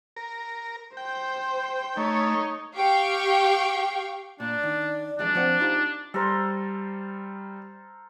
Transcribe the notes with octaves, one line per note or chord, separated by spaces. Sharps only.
A#4
C5 G5
A3 D#4 C#5
G4 F5 G5 C#6
A#2 D4 D5
D#3
F2 E3 G#3 D4
F3 C4 F#5
D#4 F4 G4
G3 A4 A#4 C5